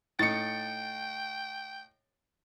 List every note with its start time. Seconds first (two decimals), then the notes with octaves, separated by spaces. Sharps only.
0.19 A2 D#4 G5 A6 C#7